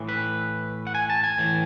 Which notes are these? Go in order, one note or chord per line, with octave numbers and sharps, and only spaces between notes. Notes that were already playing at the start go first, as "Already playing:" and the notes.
Already playing: A2 E3
B4
F#5
G#5
A5
G#5
A2 E3